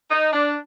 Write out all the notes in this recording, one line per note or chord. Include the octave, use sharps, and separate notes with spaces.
D#4
D4